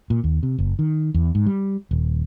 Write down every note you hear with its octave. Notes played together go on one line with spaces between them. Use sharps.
A#2
D#2
C3
F#1
D#3
E2
G#2
G3
D#1